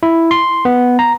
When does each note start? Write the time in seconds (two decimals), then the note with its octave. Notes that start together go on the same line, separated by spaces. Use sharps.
0.03 E4
0.31 C6
0.65 B3
0.99 A#5